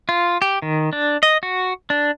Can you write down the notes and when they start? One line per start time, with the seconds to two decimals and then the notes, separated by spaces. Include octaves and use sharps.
0.09 F4
0.42 G4
0.62 D#3
0.93 D4
1.23 D#5
1.43 F#4
1.90 D4